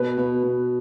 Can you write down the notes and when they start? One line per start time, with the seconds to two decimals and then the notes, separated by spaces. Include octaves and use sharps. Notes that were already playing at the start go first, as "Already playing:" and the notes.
Already playing: B2 B4
0.17 B2
0.43 B2